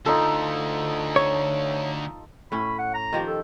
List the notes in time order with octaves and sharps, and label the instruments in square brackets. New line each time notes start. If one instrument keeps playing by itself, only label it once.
[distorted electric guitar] D2 [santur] D#4 F4 A4
[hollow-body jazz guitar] C#5
[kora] A2 C#4 [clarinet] B5
[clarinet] F#5
A#5
[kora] D#3 F3 G4
[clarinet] A4